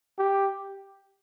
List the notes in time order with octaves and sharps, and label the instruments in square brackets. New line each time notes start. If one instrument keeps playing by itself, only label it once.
[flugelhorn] G4